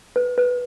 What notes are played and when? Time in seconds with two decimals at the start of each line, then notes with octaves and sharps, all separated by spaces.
0.16 B4
0.38 B4